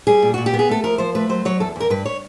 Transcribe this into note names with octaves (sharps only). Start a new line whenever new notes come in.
G3 G#4
A#2
A#2 F#4
G4
B3
G#4
A3 A4
F3 A#4
F3 C5
A3 B4
F#3 C5
F#3 C#5
E2 A4
E2 A#4
G2 B4
C#5